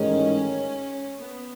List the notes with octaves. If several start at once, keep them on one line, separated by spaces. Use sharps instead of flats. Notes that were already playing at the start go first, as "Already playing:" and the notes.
Already playing: A1 G#2 D#3 G#3 C#4
B3